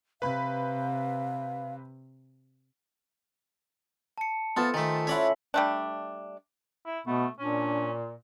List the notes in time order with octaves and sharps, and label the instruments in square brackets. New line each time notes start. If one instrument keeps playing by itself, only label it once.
[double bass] C3 [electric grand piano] B4 B5 [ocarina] F5
[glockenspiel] A5 C#7
[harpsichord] B3 [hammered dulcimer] F4 A4 C5
[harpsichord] D#3 A3 [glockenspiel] G#5 B6
[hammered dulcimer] C#4 E4 [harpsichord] C#5 D5 F#5 [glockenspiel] B6 F#7
[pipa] G3 A3 D4
[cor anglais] E4
[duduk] B2 [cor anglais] A3 [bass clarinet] B3
[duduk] A#2 [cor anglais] C#4 [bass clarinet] D4